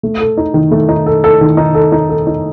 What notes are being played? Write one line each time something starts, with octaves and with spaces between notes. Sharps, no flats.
A3
A4
D#4
D#3
A3
D#4
A4
A4
D#3
D#4
A4
D#4
A4
D#4